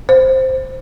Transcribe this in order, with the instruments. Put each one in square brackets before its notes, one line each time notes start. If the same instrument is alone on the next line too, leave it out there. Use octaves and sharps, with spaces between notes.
[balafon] C5